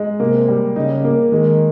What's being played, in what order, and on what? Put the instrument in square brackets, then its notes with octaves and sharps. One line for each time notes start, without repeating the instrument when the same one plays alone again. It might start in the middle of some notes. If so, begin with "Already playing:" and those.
Already playing: [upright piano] G#3 D#4
[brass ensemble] C3 [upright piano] A#3
[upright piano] G3
[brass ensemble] C#3 [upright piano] D#4
[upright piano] A#3
[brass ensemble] D#3 [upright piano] G#3